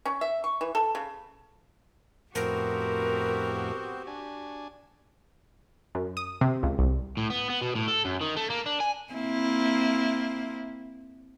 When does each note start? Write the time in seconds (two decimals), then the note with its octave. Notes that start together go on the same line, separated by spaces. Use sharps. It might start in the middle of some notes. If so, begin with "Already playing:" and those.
0.05 C#4
0.21 E5
0.44 C#6
0.61 E3
0.75 A4
0.95 C#3
2.35 F2 A2 B3 C4 F#4 G4 A#4 C5
4.07 D4 G#5
5.95 F#2
6.17 D#6
6.41 C3
6.63 C#2
6.79 C2
7.17 A2
7.30 B3
7.50 B3
7.62 B2
7.75 A2
7.88 A4
8.05 F#2
8.21 D#3
8.36 A3
8.50 A#3
8.66 D4
8.80 G#5
9.13 A#3 C4 E4